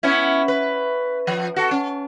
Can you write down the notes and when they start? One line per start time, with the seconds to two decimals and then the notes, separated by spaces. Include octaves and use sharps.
0.03 B3 C#4 E4
0.48 B4
1.27 F3
1.56 F#4 A4
1.71 C#4